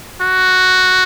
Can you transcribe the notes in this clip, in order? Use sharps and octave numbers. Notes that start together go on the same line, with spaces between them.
F#4